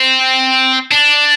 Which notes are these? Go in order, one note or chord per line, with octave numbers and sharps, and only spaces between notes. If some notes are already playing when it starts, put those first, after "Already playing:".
Already playing: C4
D4